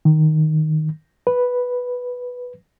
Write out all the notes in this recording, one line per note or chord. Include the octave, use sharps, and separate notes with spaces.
D#3
B4